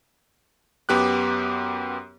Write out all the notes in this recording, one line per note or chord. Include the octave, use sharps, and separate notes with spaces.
F#2 B3 G4 D6 F#6